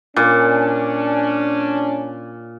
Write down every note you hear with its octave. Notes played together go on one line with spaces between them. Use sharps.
A#2 C#4 D4